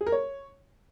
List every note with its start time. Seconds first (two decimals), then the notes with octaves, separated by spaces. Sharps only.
0.01 G#4
0.06 A#4
0.12 C#5